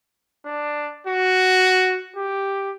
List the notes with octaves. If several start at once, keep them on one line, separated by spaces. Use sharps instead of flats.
D4
F#4
G4